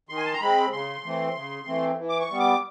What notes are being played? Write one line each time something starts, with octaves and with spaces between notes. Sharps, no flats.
D#3 C6
G#5
A5
A#5
G#3 C4 B5
C#3 C6
E3 A3 C4
C#3
E3 A3 C4
E3
D6
C#6
G3 B3
D6